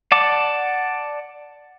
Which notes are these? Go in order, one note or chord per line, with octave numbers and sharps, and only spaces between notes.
D5 F#5 A5 D6